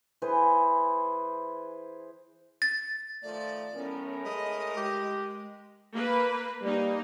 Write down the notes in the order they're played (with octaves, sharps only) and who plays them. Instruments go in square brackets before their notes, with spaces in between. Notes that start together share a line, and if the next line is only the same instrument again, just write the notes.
[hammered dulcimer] E3 G#4 B4 C5
[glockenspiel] A6
[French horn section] D#3 F3 A3 [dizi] D5
[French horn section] A2 A#4 [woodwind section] F#3 B3 C#4
[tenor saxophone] G#3 [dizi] D#5 [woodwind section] B5 D#6
[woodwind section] G#3 [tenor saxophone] G4
[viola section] A#3 B4
[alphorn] G3 [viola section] A#3 D#4